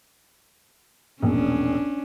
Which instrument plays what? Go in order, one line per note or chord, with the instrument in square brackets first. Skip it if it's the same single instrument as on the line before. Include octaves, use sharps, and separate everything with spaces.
[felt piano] E1 A#1 [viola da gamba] C#4 D4